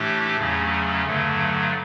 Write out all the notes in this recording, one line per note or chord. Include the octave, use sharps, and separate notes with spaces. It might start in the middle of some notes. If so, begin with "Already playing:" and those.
Already playing: A2 E3 A3 D4 G4
E2 C#3 F#3 A3 C#4
G2 D3 F#3 A3